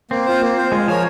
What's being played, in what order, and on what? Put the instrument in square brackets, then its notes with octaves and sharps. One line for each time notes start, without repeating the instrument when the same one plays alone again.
[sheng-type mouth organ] A#3 [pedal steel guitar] C4
[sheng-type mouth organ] F4 C5
A#3
F4 C5
[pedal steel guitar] G#3 [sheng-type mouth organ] F4
[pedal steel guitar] F3 [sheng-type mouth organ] A#4 C#5 G#5